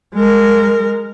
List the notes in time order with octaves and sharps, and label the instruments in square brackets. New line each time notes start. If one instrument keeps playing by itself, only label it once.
[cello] G#3 A#4